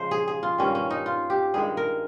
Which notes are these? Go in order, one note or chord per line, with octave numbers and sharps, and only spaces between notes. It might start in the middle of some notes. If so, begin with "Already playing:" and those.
Already playing: C#3 F3 G#3 C5
G#4
G#4
F4
G2 D#3 A#3 C#4
C#4
D#4
F4
G4
G2 D#3 G#3 G#4
A#4